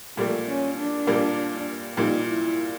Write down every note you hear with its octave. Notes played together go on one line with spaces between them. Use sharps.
A#2 G3 A3 A#3
C#4
D4
A#2 G3 A#3
A#2 G3 A#3 D#4
E4